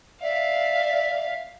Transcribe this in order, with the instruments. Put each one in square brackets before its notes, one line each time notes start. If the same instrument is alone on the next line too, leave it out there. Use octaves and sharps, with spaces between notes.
[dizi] D5 [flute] E5 [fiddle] F5